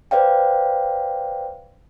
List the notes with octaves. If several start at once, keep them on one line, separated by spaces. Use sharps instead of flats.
B4 C5 D5 F5 G5